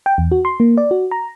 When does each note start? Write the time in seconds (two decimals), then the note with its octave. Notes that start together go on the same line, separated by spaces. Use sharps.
0.06 G5
0.18 E2
0.32 F#4
0.45 C6
0.60 A#3
0.78 D5
0.91 F#4
1.11 A#5